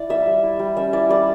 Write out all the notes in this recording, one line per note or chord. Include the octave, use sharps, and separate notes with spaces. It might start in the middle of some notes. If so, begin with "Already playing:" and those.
Already playing: E4 D5
G3 E5
G3
E4
G3
C#4 E5
E4 D5
G3 D5